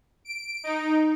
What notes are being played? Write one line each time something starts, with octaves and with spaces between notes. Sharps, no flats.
D7
D#4